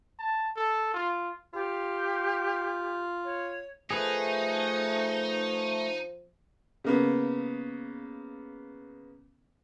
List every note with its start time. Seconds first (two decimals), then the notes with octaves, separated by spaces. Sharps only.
0.19 A5
0.56 A4
0.94 F4
1.53 F4 G4
3.24 C#5
3.91 F3 A3 D#4 G#4 B4
6.84 C#3 A#3 B3